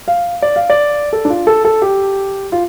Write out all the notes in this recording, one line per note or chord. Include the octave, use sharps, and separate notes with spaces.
F5
D5
F5
D5
A4
D4
F4
A4
A4
G4
F4